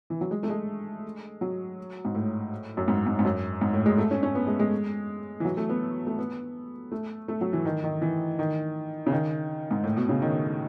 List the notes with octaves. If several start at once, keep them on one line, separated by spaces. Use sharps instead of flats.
E3
F#3
G#3
A3
G#3
F#3
G#2
A2
F#2
G#2
G#2
G#2
F#2
G#2
A2
G#3
A3
C#4
C#4
B3
G#3
G#3
E3
F#3
A3
B3
A3
B3
A3
A3
F#3
E3
D#3
D#3
E3
D#3
C#3
D#3
G#2
A2
B2
C#3
D#3